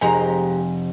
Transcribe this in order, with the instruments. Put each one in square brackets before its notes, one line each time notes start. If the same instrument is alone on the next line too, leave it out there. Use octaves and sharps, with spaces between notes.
[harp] F1 [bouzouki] G#3 G4 A#5 [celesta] G#5